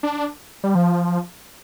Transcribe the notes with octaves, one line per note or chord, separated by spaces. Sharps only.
D4
G3
F3